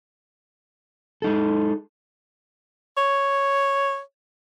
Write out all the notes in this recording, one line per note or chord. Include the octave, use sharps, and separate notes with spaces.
G#3 D#4 A4
C#5